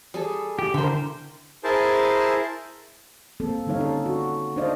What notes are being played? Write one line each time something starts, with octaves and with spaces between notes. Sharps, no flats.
G3 G#4 A4
G4
D3 E4 A#4 C5
E4 G#4 A#4 C5 A5
A#3 C4 A4
D3 G3 D#4 C#5 F5
C#4 A4
F#4
D4 D#4 C5 D5 D#5 F5